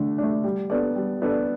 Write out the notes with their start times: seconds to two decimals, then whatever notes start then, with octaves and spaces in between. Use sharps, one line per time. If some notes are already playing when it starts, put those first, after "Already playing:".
Already playing: D3 A3 D4
0.18 A3 D4
0.44 G3
0.70 B3 D4 A4 D5
0.96 G3
1.22 B3 D4 A4 D5